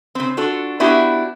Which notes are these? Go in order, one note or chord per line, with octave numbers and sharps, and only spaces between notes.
C#3 C4
D4 F4 F#4 A4
B3 D4 E4 F#4 G4